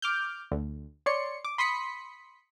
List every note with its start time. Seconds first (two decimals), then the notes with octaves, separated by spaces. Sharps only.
0.02 D6 F6 G6
0.52 D2
1.06 C#5 D5 C6 C#7
1.45 D6
1.58 B5 C6 D#6 B6 C#7